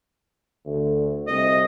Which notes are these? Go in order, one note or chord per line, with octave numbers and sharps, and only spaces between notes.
D2
C2 D#5